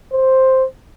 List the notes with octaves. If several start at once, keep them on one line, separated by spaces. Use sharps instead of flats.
C5